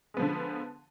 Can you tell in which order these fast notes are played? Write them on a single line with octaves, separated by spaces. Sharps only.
G#3 B3 F3 D3